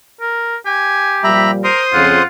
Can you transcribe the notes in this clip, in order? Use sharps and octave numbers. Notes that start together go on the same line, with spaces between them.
A#4
G4 G#5
A#2 F3 G3 E5 A#5 B5
A#4 C5 C6 D#6
F2 C#3 F4 F#5